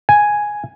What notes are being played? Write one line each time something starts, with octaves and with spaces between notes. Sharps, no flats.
G#5